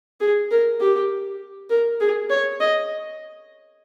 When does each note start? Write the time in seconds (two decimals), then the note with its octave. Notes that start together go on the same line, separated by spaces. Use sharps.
0.20 G#4
0.51 A#4
0.80 G4
1.70 A#4
2.00 G#4
2.30 C#5
2.60 D#5